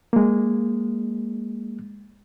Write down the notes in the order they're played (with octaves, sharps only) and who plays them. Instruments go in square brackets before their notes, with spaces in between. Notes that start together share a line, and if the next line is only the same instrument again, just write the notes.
[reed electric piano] G#3 A#3